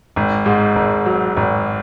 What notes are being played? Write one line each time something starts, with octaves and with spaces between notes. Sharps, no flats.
G#1
G#2
G#1
F#3
G#1